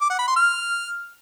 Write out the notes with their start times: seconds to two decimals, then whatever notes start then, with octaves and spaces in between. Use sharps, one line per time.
0.01 D6
0.10 F#5
0.19 B5
0.27 C6
0.36 F6